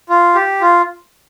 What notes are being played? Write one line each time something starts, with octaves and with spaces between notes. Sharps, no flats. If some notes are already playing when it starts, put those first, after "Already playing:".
F4
G4
F4